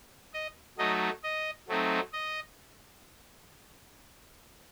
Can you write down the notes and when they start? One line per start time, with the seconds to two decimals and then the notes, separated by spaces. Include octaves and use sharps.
0.34 D#5
0.78 F#3 A3 D#4 D#5
1.23 D#5
1.68 F#3 A3 C4 D#4
2.13 D#5